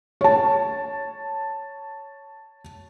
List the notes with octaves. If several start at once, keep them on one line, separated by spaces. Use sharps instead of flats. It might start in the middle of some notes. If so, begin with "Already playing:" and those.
C#5 A5